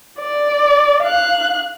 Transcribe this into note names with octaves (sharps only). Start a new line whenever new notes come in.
D5
F5 F#6